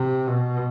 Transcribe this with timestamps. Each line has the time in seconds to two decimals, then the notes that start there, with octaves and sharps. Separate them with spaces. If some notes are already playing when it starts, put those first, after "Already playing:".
Already playing: C3
0.28 B2